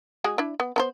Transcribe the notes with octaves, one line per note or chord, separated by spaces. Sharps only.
G#3 F#4 G#4
D4 E4
B3
B3 A#4 C5